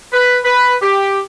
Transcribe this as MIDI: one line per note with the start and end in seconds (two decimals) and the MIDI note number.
0.13 0.39 71
0.45 0.76 71
0.82 1.20 67